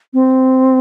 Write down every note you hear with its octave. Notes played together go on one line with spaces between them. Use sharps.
C4